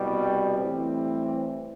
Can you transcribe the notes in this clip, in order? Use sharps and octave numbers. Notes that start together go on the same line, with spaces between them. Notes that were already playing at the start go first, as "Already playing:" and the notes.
Already playing: C2 B2 G3
A2 E3 G3 C4